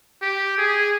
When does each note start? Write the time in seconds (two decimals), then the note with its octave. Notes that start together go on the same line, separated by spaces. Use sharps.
0.22 G4
0.58 G#4